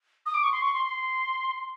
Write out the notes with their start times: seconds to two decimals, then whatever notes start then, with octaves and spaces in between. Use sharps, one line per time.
0.26 D#6
0.34 D6
0.43 C#6
0.52 C6
0.62 C#6
0.74 C6
0.86 C6